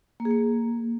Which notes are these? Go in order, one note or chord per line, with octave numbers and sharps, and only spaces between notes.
A#3
G#4
A#3